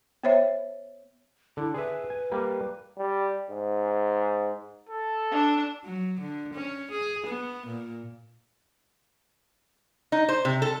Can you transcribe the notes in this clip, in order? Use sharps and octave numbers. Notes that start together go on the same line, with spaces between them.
B3 C5 C#5 E5
D3 E4
G#4 B4 E5
G#5
G3 A#3
G3
G#2
A4
D4
F#3
D3
C#4
G#4
B3
A#2
D#4
C5
C3
A4